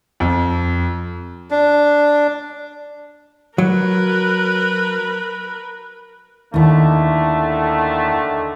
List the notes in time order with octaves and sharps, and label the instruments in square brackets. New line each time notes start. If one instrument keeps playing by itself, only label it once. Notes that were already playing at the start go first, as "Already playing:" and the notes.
[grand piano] F2
[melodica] D4
[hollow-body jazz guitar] F#3 [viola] A#4 B4
[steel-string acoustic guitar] D#2 E4 [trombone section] D3 D#3 A3